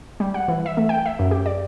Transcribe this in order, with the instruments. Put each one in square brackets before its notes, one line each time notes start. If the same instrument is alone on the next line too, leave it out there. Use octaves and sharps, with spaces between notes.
[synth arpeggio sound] G3
F#5
E3
E5
A3
G5
E5
F#2
G4
D5